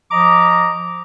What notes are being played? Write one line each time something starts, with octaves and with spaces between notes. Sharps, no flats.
F3 D#5 A#5 D6